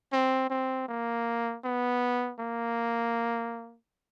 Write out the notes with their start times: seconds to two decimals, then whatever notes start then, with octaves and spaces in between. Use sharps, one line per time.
0.12 C4
0.50 C4
0.89 A#3
1.65 B3
2.40 A#3